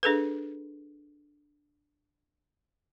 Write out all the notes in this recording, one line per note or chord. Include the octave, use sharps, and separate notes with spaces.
D4 G#4 A4 B4